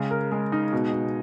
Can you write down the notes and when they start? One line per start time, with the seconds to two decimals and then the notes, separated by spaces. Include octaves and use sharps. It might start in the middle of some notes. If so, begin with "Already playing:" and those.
Already playing: C#3 G#3
0.10 A#4
0.32 G#3
0.52 D#4
0.73 B2
0.93 B2